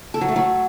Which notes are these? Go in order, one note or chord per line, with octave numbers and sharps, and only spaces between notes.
A4
F#3
A3
F#3